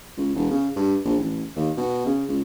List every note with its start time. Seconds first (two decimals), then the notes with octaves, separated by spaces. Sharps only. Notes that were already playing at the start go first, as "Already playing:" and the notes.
0.17 C#2
0.35 E1
0.51 C#3
0.76 G2
1.05 A#1
1.19 A1
1.56 D#2
1.77 B2
2.06 C#3
2.29 C#2